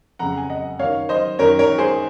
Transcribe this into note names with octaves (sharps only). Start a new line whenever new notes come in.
F2 C#3 F#5 A#5
G#5
D#5 F#5
F#2 D#3 C#5 F5
C5 D#5
F#2 D#3 A#4 C#5
A#4 C#5
G#4 C5